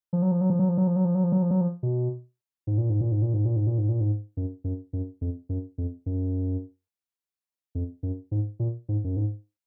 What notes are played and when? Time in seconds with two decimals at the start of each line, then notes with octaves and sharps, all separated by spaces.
0.13 F3
0.22 F#3
0.31 F3
0.41 F#3
0.50 F3
0.59 F#3
0.69 F3
0.77 F#3
0.87 F3
0.96 F#3
1.05 F3
1.15 F#3
1.24 F3
1.32 F#3
1.42 F3
1.51 F#3
1.61 F3
1.83 B2
2.67 G#2
2.78 A#2
2.90 G#2
3.01 A#2
3.12 G#2
3.22 A#2
3.34 G#2
3.45 A#2
3.56 G#2
3.67 A#2
3.78 G#2
3.89 A#2
4.00 G#2
4.37 F#2
4.64 F#2
4.93 F#2
5.21 F2
5.49 F#2
5.78 F2
6.06 F#2
7.75 F2
8.03 F#2
8.31 G#2
8.60 A#2
8.89 G#2
9.04 F#2
9.16 G#2